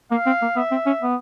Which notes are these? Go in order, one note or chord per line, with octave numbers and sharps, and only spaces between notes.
A#3 F5
C4
A#3
B3 E5
C4
C#4
B3